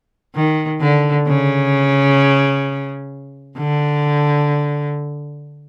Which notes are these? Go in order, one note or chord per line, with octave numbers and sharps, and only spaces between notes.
D#3
D3
C#3
D3